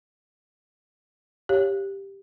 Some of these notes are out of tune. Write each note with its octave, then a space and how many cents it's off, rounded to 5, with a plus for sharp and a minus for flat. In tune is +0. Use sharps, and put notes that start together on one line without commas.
G4 +5 C#5 +0 F5 +0